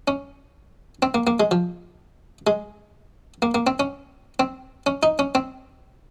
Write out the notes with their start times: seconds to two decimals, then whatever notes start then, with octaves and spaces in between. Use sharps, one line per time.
0.08 C#4
1.02 C4
1.14 A#3
1.27 A#3
1.40 G#3
1.51 F3
2.47 G#3
3.42 A#3
3.55 A#3
3.67 C4
3.80 C#4
4.40 C4
4.86 C#4
5.03 D#4
5.19 C#4
5.35 C4